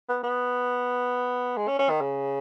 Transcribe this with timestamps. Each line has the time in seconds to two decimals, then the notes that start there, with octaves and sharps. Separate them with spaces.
0.09 B3
0.23 B3
1.57 G#3
1.68 C#4
1.79 C#4
1.90 D#3
2.01 C#3